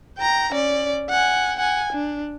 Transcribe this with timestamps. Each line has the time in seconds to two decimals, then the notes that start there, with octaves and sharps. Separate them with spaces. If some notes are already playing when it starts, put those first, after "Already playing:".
0.18 G5 A#5
0.53 C#4 D5
1.10 F#5 G#5
1.60 F#5 G#5
1.93 D4